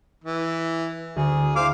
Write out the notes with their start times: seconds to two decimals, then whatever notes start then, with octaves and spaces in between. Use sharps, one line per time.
0.24 E3
1.16 D2 G#4
1.56 E4 G#4 C5 F5 D6